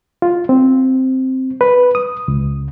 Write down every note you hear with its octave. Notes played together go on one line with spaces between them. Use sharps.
F4
C4
B4
D#6
C#2